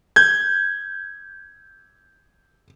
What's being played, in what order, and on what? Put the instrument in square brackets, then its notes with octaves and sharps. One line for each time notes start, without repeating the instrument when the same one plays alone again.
[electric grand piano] G6 G#6